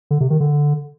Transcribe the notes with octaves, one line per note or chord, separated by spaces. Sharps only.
D3
C3
D#3
D3